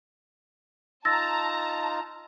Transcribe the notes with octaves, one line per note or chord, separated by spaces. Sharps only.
D#4 F4 A5 A#5 E6 A6 A#6